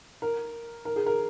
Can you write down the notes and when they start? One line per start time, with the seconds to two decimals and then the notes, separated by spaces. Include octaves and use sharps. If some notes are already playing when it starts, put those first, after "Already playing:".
0.22 A#4
0.85 A#4
0.96 G#4
1.06 A#4